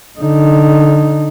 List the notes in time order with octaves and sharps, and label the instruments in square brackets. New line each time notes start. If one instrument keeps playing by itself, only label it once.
[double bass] D3 D#4